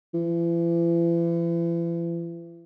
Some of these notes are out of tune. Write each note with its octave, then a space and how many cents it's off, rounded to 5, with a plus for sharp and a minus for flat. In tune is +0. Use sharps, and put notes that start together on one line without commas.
E3 +40